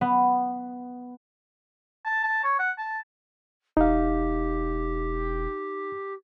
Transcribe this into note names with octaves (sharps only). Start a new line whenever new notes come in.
B3
A5
A5
C#5
F#5
A5
E1 D#4 G4 F5